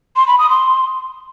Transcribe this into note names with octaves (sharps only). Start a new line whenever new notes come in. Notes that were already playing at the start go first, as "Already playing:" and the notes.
C6
B5
D#6
C6